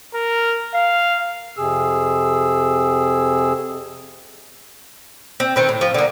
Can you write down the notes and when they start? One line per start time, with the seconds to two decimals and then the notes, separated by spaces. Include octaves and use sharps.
0.14 A#4
0.74 F5
1.57 F2 C3 G#4 E6
5.40 C4
5.56 D#3 C4 B4
5.69 A2
5.81 F3
5.94 D3 A#3